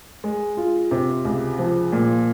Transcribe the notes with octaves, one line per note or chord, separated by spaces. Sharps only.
G#3
F4
C3
C#2
F3
A#2